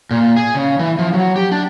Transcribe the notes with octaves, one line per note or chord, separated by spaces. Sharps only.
A#2
G#4
C#3
E3
F3
F#3
G4
D4